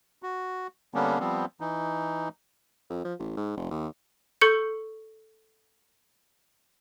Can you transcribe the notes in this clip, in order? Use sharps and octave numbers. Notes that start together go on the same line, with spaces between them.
F#4
D3 G3 A#3 B3 C#4 D4
F3 G3 B3 C4
E3 D#4
F2
F3
A1
G#2
F1
D#2
A4 C#6 G6 C#7